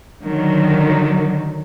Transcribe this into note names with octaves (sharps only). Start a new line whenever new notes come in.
D3 D#3 F#3